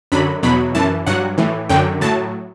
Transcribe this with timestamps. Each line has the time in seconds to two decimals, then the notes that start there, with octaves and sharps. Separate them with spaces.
0.12 F#2 D3 F#3 B5
0.43 E2 B2 F#3 B5
0.75 F#2 E3 A5
1.07 G2 F#3 F#5
1.38 A2 E3
1.69 F#2 D3 F#3 G5
2.01 A2 F#3 A5